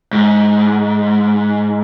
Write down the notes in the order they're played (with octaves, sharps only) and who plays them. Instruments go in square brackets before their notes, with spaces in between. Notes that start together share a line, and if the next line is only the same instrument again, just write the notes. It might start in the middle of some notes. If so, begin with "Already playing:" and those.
[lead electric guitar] G#2